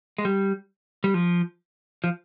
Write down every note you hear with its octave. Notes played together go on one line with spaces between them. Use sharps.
G#3
G3
G3
F3
F3